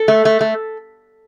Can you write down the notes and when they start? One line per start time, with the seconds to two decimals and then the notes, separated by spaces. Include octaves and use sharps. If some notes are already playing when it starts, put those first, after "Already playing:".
Already playing: A4
0.08 A3
0.25 A3
0.41 A3